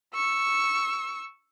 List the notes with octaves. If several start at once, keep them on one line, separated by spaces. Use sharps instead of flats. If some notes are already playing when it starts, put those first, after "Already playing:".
C#6 E6